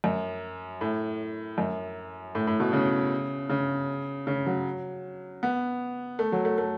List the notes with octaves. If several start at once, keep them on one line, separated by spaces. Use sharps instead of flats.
F#2
A2
F#2
A2
A2
B2
C#3
C#3
C#3
F#3
B3
A3
F#3
A3
A3